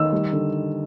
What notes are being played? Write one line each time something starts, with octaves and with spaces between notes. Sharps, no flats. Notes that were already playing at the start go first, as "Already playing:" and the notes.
Already playing: D#3 E6
G3
D3